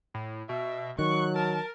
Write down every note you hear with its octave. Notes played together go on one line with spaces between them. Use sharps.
A2
B2 E5
D#3 F#3 C#6 F#6
A#4 A5